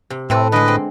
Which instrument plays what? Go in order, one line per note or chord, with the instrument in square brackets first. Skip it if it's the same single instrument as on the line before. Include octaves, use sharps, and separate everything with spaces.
[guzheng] C3
[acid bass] A2 [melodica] C4 [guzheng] A4 B4 E5
[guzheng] D3 G#3 [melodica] B4 D#5
[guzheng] C4